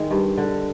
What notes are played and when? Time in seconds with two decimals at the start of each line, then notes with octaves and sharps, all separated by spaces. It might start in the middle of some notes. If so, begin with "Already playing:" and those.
Already playing: D#3 G#3
0.11 G2
0.37 D3